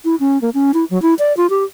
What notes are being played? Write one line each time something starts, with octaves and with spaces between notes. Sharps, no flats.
E4
C#4
A#3
C#4
E4
F#3
E4
D5
F4
G4